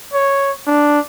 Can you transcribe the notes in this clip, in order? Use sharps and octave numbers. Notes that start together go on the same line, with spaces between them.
C#5
D4